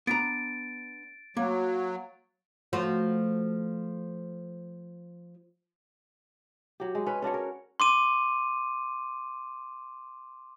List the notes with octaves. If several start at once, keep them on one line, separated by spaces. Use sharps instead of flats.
B3 D4 A#5 A6 D7
F#3 A#3
F3 A3 F#4
F#3 G4
G#3
C#4 B4
C#4 D4 F#4 C#5
A#4
C6 D6 D#7